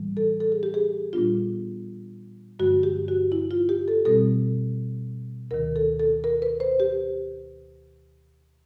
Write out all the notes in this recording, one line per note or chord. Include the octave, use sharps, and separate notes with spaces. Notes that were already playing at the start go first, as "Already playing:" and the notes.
Already playing: A2 E3 G3
A4
A4
G#4
G4
G#4
A#2 G3 B3 D4 F4
G2 D3 F3 G#3 F#4
G4
F#4
E4
F4
G4
A4
B2 G3 C4 A4
D2 C3 D#3 A#4
A4
A4
A#4
B4
C5
G4